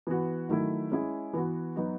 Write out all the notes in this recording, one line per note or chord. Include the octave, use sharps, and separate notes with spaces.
E3 B3 F#4
D#3 F#3 A3 E4
G#3 C#4 E4 G#4
E3 B3 F#4
F#3 B3 D#4 F#4